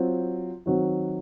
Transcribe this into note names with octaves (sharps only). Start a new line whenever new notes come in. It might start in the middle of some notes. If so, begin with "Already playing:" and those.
Already playing: F#3 C4 F4
D#3 F#3 C4 F#4